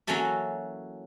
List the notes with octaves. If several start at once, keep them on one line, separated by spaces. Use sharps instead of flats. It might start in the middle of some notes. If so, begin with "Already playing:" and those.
E3 F#3 A#3 C#4 A4 E5